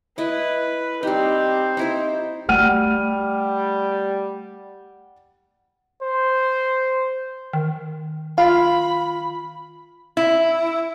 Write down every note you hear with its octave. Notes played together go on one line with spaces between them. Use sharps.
E4 B4 D#5
G3 C4 D#4 G4
D#4 E4 C5
G3 A3 F#5 F6 D#7
C5
D#3
F4 F5 B5
E4